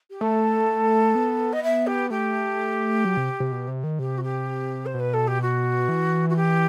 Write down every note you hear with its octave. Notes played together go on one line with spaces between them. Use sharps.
G4
A3 A4
B3
D#5
E5
G4
A3 G4
F#3
C3
C3
B2
C3
D#3
C3 G4
F#4
G4
C5
B2
B4
A4
G4
F#4
E3
F#4
G4